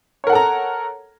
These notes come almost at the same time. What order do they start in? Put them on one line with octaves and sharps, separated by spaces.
C#5 A#4 F#5 A4 A#5